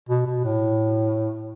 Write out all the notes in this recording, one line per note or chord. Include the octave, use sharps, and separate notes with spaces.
B2
B2
A2